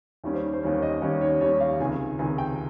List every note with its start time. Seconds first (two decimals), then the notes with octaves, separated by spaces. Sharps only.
0.24 D#2 D#3 G3 C#4
0.34 C5
0.53 C5
0.63 D#2 D#3 G3 C#4 C#5
0.82 D#5
1.02 D#2 D#3 G3 C#4 C#5
1.21 C#5
1.41 D#2 D#3 G3 C#4 C#5
1.60 F5
1.80 C#2 C3 D#3 G#5
2.19 C#2 C3 D#3 G#5
2.38 G5